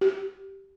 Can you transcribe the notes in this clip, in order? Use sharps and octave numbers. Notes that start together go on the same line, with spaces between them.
G4